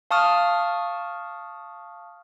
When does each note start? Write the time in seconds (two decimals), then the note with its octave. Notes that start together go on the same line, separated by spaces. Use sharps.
0.11 F5 A5 C#6 D#6 F6